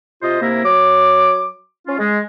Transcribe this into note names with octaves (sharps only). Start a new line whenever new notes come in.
C3 F4 C5 D#5
C3 A#3 E4 A#4
F#3 C#5 D6
C#4 F4
G#3